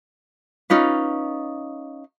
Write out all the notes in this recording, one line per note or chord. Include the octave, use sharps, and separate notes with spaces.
C#4 D#4 F4 B4